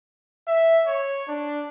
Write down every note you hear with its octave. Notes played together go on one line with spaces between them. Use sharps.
E5
C#5
D4